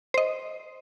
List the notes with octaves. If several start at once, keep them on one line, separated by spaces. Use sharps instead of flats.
C5 D#5